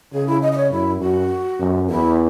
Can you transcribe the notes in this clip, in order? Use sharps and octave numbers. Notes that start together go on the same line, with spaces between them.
C#3 G#4
E4
D#5
D#5
C#5
F#2 E4
F#2 F#4
F#2
E2 E4